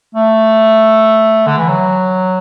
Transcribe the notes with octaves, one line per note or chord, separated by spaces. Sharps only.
A3
D3
E3
F#3